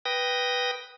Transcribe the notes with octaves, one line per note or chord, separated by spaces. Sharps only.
B4 G5 D#6 A#6